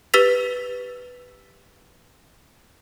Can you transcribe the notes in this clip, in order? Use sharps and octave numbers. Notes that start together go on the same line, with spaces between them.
G4 B4 E6 A6 B6 F7